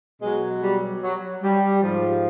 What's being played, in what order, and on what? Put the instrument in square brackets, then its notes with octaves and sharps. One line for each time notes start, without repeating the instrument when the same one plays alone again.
[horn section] B2 F#3 G#3
G3
F#3
G3
G#2 F3